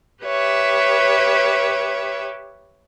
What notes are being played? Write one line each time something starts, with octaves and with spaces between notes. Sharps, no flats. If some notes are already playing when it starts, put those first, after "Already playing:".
G4 B4 C#5 E5